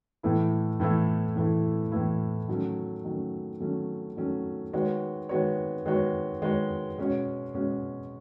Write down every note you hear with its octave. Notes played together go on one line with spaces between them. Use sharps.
A2 E3 A3 E4
A2 E3 A3 E4
A2 E3 A3 E4
A2 E3 A3 E4
D#3 F#3 A3 C#4
D#3 F#3 A3 C#4
D#3 F#3 A3 C#4
D#3 F#3 A3 C#4
D#3 G#3 B3 F#4 C#5
D#3 G#3 B3 F#4 C#5
D#3 G#3 B3 F#4 C#5
D#3 G#3 B3 F#4 C#5
B2 G#3 C#4 F#4 C#5
B2 G#3 C#4 F#4 C#5